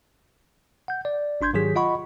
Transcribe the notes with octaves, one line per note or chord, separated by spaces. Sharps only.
F#5 G6
D5
G#1 D4 C6 G6 G#6
G#2 D#3 F#3 G4 G#4 B6
F4 D#5 F#5 B5 C#6